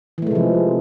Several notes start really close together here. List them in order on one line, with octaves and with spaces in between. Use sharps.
E3 A3 G#3 C3 F3